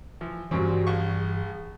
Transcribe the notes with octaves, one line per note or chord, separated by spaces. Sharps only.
E3 F3
G2 A#2 C#3 E3 G3 C4 F#4
A#1 G#4 C#6